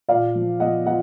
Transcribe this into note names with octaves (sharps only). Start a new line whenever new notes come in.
A#2 D5 F5
F3
F3 D#5 F#5
F3 D#5 F#5